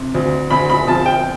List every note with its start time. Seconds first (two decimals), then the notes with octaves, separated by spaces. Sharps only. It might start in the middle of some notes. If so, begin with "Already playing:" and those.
Already playing: C3
0.14 D2
0.50 D2 B5
0.70 B5
0.87 F3 A5
1.06 G5